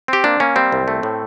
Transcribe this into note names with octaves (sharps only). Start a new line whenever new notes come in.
C4 G4
A#3 D4
A#3 C#4
G3 C4
C2
A3
A2